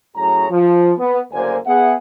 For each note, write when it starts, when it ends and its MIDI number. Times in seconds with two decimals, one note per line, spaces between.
0.16 0.49 42
0.16 0.49 45
0.16 0.49 68
0.16 0.49 73
0.16 0.49 82
0.50 0.92 53
0.98 1.19 59
1.32 1.56 30
1.32 1.56 38
1.32 1.56 50
1.32 1.56 58
1.32 1.56 72
1.32 1.56 80
1.66 1.93 59
1.66 1.93 68
1.66 1.93 76
1.66 1.93 78